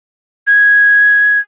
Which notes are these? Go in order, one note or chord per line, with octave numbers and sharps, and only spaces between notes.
G#6